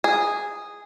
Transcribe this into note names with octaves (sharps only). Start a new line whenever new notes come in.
G#4